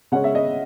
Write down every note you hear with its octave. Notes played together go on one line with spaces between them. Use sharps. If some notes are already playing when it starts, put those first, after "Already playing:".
C#3 G#3 C#4 F#5
E5
D#5